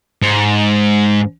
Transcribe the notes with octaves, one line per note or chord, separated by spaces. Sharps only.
G#2